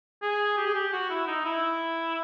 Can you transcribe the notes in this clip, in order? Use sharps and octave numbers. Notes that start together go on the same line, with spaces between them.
G#4
G4
G#4
G4
F#4
E4
D#4
E4